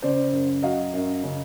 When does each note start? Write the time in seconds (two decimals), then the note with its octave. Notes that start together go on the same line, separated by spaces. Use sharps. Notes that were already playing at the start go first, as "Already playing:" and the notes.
0.02 C#3 C5 D5
0.33 F#2
0.63 F#3 D#5 F5
0.94 F#2
1.23 C#3